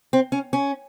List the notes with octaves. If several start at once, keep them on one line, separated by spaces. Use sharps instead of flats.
C4
C#4
C#4